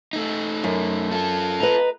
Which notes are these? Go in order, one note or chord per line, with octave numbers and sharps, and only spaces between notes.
A3 D#4
F#2
F4 A4
B4 D#5 A#5